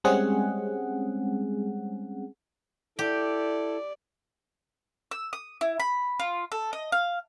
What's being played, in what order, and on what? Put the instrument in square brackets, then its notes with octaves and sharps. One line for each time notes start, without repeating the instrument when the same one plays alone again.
[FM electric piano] G3 G#3 C4 C#4 G#4 F#5
[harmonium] E4 A4 [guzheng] G4 [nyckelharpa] D5
[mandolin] E6
D#6
E4
B5
F4
A4
D#5
F5